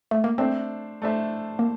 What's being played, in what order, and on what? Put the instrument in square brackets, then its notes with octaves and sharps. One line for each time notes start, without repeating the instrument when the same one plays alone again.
[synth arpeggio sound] A3
A#3
[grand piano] A3 D4 A4 C5 E5 [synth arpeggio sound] C4
[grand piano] A3 D4 A4 C5 E5
[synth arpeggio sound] A#3